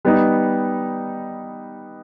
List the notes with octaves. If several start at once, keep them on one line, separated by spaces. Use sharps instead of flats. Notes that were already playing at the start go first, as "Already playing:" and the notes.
G3 B3 D#4